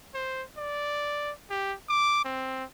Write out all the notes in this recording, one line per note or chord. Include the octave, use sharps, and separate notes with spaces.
C5
D5
G4
D6
C4